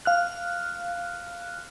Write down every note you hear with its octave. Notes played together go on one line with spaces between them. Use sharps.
F5 F6 F#6